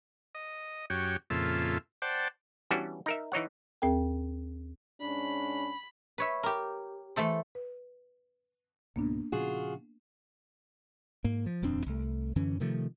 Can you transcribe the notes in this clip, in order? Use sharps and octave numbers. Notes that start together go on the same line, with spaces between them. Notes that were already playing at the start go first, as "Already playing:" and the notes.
D#5
F#2 F#4 G4 C#5 G5
F2 A#2 C#3 F4 A4 E5
C5 D5 F#5 G5 A5
E3 G3 B3 C#4 D4 F#4
D#4 A#4 E5
E3 D#4 C#5 F#5
D#2 C4 G#4 A#4 G5
G#2 C#4 D4 B5
B4 C#5 E5
G4 A#4
E3 A3 A4 C5
B4
C#2 G#2 B2 A#3 B3 D4
A#2 C#3 F3 F4 F#4 G#4
G#2 A#3
F3
D#1 F2 C4 D4
C2 A3
F#2 D3 E3 C#4
C3 D#3 F3 A3